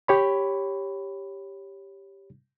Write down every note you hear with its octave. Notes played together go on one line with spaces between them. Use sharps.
G4 C#5 B5